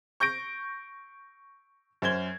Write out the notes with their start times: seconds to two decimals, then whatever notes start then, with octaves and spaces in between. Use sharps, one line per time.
0.20 C#6 G6 A#6 D7
2.02 F#2 C5 G#6 G7